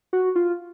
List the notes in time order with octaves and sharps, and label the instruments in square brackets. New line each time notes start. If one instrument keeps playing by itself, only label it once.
[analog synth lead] F#4
F4